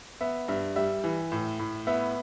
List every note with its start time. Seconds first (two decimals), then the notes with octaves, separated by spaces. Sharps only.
0.21 B3 E5
0.48 G2 E5
0.76 G3 E5
1.04 E3
1.32 A2
1.59 A2
1.87 B3 E5